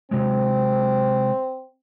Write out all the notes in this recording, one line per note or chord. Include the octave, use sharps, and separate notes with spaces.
C3 F#3 G#3 C4